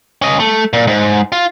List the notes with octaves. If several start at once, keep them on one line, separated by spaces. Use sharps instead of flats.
C#4 D#5
A3
A#2
G#2
F4